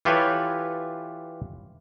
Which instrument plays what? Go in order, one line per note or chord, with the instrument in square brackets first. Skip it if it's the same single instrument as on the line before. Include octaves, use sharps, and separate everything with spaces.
[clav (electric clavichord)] E3 F4 G4 A4 B4 C#5